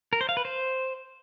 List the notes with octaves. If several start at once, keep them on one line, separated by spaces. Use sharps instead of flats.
A#4
C5
F5
B4
C5